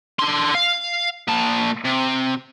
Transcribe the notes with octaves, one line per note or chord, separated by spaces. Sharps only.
D3 C6
F5
A#2 A5
C3